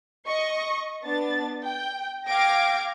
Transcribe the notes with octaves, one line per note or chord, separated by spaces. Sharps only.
D#5 C#6
B3 D4 A6
G5
F5 G5 D6 G#6 A#6 D7